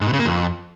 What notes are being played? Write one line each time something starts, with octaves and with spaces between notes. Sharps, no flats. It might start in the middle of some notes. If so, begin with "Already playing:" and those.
G#2
B2
C#3
A#3
F2